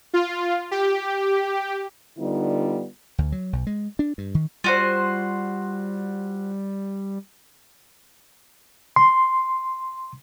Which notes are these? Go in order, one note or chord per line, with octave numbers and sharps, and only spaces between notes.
F4
G4
D3 G3 B3 D#4 F4
D2
F#3
B1
G#3
D4
G2
D#3
G3 F4 F#4 C5
C6